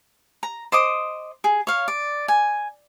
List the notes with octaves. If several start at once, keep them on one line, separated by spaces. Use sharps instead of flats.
A#5
C5 D#5 D6 D#6
G#4
C#5 F5
D5
G#5